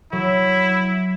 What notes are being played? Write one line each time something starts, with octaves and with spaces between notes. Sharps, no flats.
F#3 E4